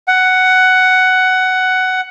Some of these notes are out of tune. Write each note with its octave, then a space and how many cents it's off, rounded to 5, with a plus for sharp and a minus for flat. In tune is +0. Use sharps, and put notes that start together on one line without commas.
F#5 +10